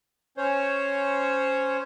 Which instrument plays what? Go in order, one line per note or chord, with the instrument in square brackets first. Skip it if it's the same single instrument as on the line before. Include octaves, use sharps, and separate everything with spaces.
[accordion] C#4 C5 C#5